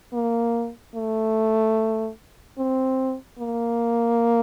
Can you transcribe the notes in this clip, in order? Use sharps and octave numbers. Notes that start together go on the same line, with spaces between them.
A#3
A3
C4
A#3